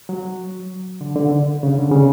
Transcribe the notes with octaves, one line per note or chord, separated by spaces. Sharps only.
F#3
D3
D3
C#3
D3
C#3